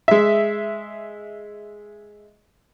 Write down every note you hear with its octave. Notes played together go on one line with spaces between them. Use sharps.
G#3 E5